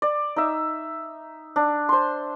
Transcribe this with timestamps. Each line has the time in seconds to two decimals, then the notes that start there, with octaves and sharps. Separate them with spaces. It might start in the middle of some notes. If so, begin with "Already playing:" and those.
0.02 D5
0.36 D#4 E5
1.56 D4
1.89 C5 C6